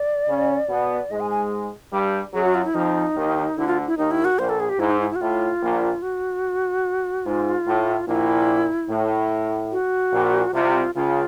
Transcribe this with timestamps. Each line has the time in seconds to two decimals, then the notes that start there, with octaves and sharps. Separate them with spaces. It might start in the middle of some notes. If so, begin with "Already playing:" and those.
Already playing: D5
0.28 C#3 C#4
0.69 B2 B3
1.11 G#2 G#3 D#5
1.20 G#5
1.31 G#5
1.92 G2 G3
2.33 F#2 F#3 G#4
2.44 F#4
2.54 F4
2.65 E4
2.74 F2 F3 D#4
3.16 D#2 D#3
3.57 D2 D3 E4
3.67 F4
3.87 E4
3.98 D#2 D#3 D#4
4.11 E4
4.25 F#4
4.38 A#1 A#2 C5
4.49 A4
4.60 G#4
4.69 G4
4.79 G#2 E4
4.91 D#4
5.00 E4
5.11 E4
5.16 F#4
5.21 A2 F4
5.62 A#1 A#2
6.02 F#4
7.26 G#2 F4
7.67 A2
8.08 A#1 A#2 E4
8.89 A2
9.72 F#4
10.13 A#1 A#2
10.53 C2 C3 F4
10.95 C#2 C#3 F4